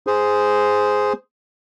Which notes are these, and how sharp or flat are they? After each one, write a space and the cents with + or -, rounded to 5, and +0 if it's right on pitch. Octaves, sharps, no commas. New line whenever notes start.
G#4 +0 C5 -10